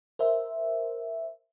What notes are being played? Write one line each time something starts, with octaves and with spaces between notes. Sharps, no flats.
A#4 C5 E5